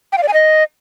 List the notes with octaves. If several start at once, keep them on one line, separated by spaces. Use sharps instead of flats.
G5
F5
D5
G#5
D#5